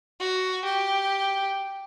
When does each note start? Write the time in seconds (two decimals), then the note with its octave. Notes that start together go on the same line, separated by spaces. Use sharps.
0.20 F#4
0.65 G4